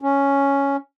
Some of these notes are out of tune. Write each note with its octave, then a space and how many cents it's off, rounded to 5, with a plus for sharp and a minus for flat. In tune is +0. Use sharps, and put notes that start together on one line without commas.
C#4 +5